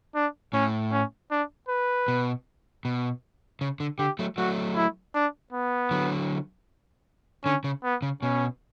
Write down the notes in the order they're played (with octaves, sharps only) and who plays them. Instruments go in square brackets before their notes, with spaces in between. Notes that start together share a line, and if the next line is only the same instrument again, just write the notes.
[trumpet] D4
[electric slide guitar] A2 [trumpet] C#4
[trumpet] C#4
D4
B4
[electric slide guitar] B2
B2
C#3
D3
[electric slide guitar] D3 [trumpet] G4
[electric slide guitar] F#3 A3
[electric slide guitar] F#3 A3 [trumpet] F#4
[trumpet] E4
D4
B3
[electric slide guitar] D3 F#3
[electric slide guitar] D3 [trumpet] C#4
[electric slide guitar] C#3
[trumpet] B3
[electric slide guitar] C#3
[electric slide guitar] B2 [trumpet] C#4